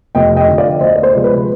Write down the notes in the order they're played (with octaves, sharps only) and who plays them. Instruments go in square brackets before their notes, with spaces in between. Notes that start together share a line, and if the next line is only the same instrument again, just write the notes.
[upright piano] F1 D#5 G5
D#5 G5
F2 D3
D5 F5
D2 C5 D#5
D5
C5
C3 F3 G#3 B3
B4